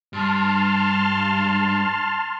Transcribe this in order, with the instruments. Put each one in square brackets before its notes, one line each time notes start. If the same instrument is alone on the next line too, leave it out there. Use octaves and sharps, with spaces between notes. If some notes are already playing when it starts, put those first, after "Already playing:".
[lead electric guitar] G2 [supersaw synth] A5 C6 F6